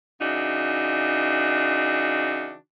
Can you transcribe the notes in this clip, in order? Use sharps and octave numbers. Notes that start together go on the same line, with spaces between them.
C#3 E3 D4 D#4 F#4